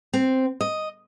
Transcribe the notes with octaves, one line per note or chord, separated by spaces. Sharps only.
C4
D#5